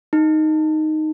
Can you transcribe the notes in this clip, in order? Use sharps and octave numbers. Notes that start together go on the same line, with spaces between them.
D#4